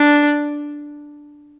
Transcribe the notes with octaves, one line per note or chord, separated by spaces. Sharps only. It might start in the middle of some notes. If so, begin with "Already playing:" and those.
Already playing: D4